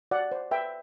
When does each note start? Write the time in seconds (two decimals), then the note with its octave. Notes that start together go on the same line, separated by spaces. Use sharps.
0.11 F#4 D5 F#5
0.32 C5
0.51 B4 E5 G5